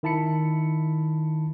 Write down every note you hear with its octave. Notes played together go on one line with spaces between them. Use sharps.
D#3 E4 A5 B5 C#7